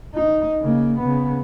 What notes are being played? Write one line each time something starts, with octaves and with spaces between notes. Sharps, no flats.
D#4
C#3 A#3
C#3 B3